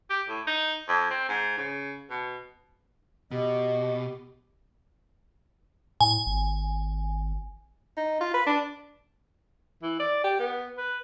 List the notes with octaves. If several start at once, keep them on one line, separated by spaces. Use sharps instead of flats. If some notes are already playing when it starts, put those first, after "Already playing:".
G4
A2
D#4
F2
C4
G#2
C#3
B2
B2 G4 D#5
A2 G#5
G#1
D#4
F4
B4
D4
E3
D5
G4
B3
B4